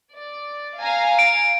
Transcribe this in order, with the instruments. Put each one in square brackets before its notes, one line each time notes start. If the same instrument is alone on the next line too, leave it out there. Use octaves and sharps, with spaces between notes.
[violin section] D5
F5 G#5 A#5
[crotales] D7